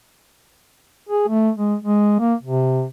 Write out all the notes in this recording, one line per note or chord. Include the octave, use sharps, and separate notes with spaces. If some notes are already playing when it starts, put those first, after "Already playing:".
G#4
A3
G#3
G#3
A#3
C3